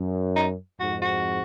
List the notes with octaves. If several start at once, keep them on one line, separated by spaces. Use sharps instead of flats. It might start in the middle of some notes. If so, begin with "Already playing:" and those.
Already playing: F#2
D#4
F2 G#2 F#4
F#4